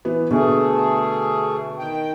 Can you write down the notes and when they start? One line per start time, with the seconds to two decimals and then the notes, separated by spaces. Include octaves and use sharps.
0.05 E3 B3
0.31 B2 D3 A3 G#4
1.79 D#3 G5